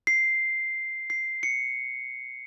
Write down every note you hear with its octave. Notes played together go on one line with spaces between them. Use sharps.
C7
C7
C#7